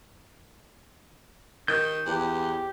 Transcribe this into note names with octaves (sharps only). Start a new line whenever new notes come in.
D#3 G6
E2 G4